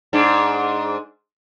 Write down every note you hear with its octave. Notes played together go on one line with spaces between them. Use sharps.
G#2 D4